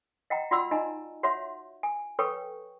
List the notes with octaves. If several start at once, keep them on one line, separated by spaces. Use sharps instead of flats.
D#5 F#5 G5 A#5
F4 F#4 D5 F#5 C6 E6
D#4 D#5 G#5 A#5
F#4 C#5 E5 F#5 C6
G#5
A4 B4 C#5 G5 C#6